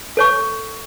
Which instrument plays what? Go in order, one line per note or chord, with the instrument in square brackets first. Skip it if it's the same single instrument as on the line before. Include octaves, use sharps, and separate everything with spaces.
[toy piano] A4 C#5 C#6